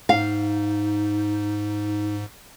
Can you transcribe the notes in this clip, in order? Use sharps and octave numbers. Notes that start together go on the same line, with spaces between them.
G#2 D#4 F5